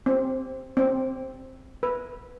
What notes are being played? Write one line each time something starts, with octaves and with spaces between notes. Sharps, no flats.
C4
C4
B4